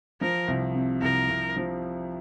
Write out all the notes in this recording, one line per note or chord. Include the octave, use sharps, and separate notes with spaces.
F3 A#4
C2
C3
C2 A#4
C2
F3